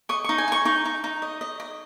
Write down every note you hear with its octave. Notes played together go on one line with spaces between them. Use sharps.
D#5 C#6
D#4 C#6
G#5
D#4 C#6
D#4 C#6
D#4
D#4
D#5
D#5
D#5